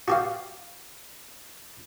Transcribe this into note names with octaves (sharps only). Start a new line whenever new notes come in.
F#4 G4 F5